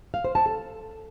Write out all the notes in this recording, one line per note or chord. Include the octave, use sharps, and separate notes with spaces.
F5
C5
A5
A4